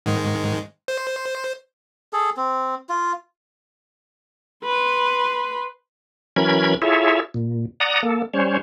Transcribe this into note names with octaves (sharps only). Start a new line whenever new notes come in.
G#2 D#3 G#3
C5
G#4 A4
C4
F4
B4 C6
E3 F#3 C#4 A#4 B5 G#6
E4 F4 G#4 A4 C#5 E5
A#2
D5 F#5 A#5 D#6
A#3 A4
G3 C#4 C5 C#5